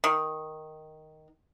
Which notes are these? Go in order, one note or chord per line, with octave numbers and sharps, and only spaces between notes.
D#3